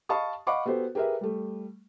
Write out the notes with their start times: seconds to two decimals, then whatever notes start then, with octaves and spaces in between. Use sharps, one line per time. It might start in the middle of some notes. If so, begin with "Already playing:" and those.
0.09 D#5 F5 A5 B5 C#6 D#6
0.47 D#5 F5 F#5 B5 C#6 D6
0.66 B3 F#4 G4 A4 C5
0.95 G4 G#4 A#4 B4 E5
1.21 G3 A3